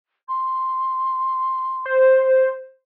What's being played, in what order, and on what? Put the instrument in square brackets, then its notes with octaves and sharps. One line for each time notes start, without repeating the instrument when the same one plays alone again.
[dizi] C6
[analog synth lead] C5